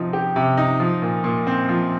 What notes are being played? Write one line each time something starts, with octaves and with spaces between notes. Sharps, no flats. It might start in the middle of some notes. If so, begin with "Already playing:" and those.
Already playing: C3 F3 D#4
G4
C3
D#4
F3
A#2
A#2
C4
F3